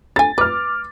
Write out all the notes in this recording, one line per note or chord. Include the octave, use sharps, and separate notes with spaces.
D3 G#5 A6
B4 D6 F6